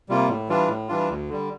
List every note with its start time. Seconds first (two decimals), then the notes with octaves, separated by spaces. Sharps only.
0.09 C3 G3 A#3 F4
0.28 A2
0.49 E3 G3 D4 F4
0.68 A2
0.89 E3 G3 D4 F4
1.10 D2
1.29 D3 G3